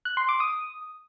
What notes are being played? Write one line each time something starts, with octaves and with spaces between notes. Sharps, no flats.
F#6
C6
D6
D#6